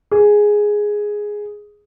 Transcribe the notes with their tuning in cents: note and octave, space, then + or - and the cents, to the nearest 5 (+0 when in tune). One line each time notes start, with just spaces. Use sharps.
G#4 +0